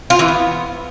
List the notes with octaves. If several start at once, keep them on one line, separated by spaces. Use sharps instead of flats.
F4
E3
B3